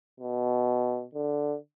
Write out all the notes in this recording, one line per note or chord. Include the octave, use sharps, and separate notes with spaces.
B2
D3